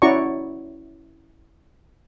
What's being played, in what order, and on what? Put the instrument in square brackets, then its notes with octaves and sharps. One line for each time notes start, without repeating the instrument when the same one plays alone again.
[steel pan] C#4 E4 F#4 D5 A#5 C#6